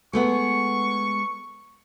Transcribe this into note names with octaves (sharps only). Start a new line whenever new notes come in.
G#3 A3 B3 C#6